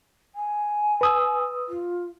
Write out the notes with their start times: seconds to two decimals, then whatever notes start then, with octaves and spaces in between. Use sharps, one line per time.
0.35 G#5
1.01 B4 D#6 E6
1.68 F4